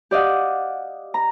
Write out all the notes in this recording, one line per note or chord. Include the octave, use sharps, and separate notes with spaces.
G4 D5 D#5 F5 F#5
A#5